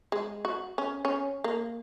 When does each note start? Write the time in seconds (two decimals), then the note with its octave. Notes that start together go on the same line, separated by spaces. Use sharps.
0.12 G#3
0.45 F#4
0.78 C#4
1.05 C#4
1.44 A#3